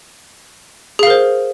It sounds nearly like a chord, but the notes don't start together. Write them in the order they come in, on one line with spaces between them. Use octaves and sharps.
G#4 F5 A#4 C5